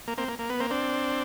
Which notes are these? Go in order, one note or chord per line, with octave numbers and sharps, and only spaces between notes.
A#3
A#3 C4
A#3
A#3
B3
A#3 C4
C4 D4